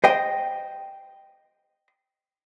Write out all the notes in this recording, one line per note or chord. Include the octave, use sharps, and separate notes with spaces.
C5 D#5 G5